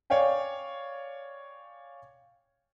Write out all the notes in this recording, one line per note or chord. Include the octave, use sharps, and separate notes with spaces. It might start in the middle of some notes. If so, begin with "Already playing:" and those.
C#5 D5 F5 G5 G#5